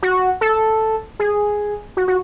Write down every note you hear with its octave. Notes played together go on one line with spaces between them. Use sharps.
F#4
A4
G#4
F#4
F#4